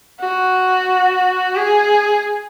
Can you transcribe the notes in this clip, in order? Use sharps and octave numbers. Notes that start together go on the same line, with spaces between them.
F#4
G#4